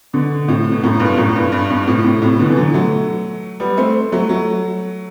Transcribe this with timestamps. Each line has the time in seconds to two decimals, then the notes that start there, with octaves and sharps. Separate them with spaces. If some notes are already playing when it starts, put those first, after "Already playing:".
0.13 B2 D3
0.48 A2 C3
0.72 B2
0.83 F#2 A2
1.00 G2 B2
1.11 B2
1.17 F#2 A2
1.36 G2
1.52 G2
1.69 G2 B2
1.87 A2 C3
2.04 A2 C3
2.22 A2 C3
2.39 B2 D3
2.50 E3
2.56 D3 F#3
2.74 F#3 A3
3.60 G3 B3
3.77 A3 C4
4.12 F#3 A3
4.29 F#3 A3